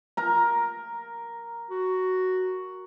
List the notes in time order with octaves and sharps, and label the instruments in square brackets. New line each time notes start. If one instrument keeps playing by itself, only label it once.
[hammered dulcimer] A#4 A#5
[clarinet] F#4